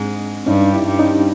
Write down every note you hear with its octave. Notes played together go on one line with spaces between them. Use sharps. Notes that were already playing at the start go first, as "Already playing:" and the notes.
Already playing: G#2 G#3 C4 D4
G2 G3 C#4 D#4
D4 E4
G2 G3
C#4 D#4